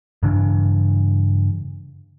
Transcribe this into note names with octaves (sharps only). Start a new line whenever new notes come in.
G2 C#3 E3 D4